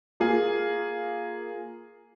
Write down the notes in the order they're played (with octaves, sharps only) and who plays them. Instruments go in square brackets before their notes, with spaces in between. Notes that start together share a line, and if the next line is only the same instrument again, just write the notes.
[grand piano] A#3 F4 G#4